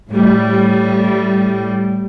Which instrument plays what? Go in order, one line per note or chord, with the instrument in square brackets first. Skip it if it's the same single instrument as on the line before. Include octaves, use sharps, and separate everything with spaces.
[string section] A2 G3